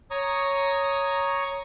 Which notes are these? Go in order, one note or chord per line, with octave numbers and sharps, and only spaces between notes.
C#5 A#5 C#6 D#6